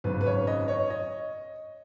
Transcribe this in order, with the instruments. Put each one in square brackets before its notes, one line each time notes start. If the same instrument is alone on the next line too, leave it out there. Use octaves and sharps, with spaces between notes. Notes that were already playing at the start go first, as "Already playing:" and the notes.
[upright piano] G#1 F#2 C#3 B4
B4
C#5
D#5
C#5
D#5